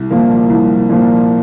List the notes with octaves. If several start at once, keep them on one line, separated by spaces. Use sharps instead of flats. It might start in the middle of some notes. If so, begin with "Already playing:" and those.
Already playing: C2
A#2 F3 A#3
C2
A#2 F3 A#3